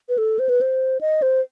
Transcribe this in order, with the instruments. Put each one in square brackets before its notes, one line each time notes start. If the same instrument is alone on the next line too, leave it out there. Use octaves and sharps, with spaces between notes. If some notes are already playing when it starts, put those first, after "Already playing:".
[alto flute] B4
A4
C5
B4
C5
D#5
C5